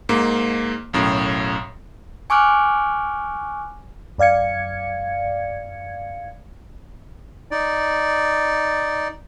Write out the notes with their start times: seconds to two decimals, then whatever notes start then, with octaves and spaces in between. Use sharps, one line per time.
0.09 G#2 A#3
0.93 B1 F#2 A2
2.30 G#5 C#6 D6 F6 F#6
4.18 F#2 D5 F5 G#6 C#7
7.51 D#4 D5